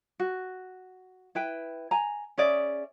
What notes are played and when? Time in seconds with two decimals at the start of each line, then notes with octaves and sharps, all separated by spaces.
0.20 F#4
1.35 E4 B4 G5
1.91 G#5 A#5
2.38 C#4 G#4 D5 E5